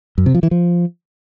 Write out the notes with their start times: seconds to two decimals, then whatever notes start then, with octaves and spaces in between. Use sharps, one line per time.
0.18 F#2
0.26 C3
0.35 F3
0.43 E3
0.51 F3